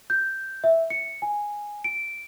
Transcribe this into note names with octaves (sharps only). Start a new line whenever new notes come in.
G6
E5
C#7
G#5
D7